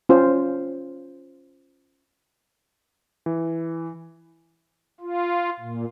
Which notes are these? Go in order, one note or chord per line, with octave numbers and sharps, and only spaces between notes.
C#4 F4 C5
E3
F4
A#2